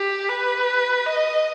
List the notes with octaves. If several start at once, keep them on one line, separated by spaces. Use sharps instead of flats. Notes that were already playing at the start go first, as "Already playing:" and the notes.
Already playing: G4
B4
D#5